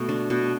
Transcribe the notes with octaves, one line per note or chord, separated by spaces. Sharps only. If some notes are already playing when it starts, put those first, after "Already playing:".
Already playing: B2 A3
D4
B2